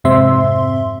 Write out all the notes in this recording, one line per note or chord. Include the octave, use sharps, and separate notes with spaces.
F2 G#2 C3 C4 E5 C6